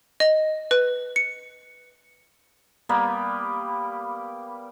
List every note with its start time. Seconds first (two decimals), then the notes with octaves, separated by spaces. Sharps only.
0.20 D#5
0.71 B4
1.16 C#7
2.89 G3 A#3 B3 B5